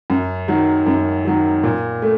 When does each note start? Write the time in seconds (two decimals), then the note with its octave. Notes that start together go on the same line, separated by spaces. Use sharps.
0.10 F#2
0.48 D#3 F#3
0.86 F#2
1.25 D#3 F#3
1.64 A#2
2.02 A3